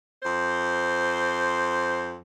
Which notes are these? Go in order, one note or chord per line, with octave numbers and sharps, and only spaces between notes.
F2 C5